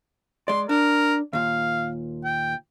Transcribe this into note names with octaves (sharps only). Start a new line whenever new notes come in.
G#3 D5 C6
D4 A#4
D#2 A#2 F5
G5